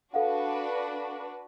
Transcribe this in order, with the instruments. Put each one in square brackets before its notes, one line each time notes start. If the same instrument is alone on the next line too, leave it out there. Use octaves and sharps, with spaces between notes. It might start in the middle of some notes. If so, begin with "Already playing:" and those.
[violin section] D4 F#4 B4 [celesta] A4 F5 F#5